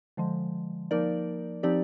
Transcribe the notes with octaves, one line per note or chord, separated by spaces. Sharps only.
D3 F3 G#3
F3 A#3 D#4 A#4 D5
F3 C4 D#4 G4 D5